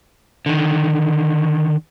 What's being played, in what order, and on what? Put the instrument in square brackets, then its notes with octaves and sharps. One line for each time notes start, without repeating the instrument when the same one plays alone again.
[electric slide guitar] D3 D#3